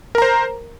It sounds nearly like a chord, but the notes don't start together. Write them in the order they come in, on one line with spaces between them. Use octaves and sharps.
A#4 A#5 C5